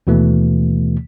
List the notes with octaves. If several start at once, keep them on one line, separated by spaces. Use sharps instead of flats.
D#2 B2 E3 A3